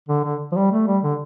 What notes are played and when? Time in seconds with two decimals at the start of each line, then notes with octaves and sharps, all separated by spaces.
0.09 D3
0.24 D3
0.52 F3
0.56 G3
0.72 A3
0.87 G3
1.03 D3